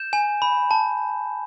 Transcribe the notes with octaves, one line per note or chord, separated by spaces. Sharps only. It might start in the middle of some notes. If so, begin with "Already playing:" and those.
Already playing: G6 E7
G#5
B5
A5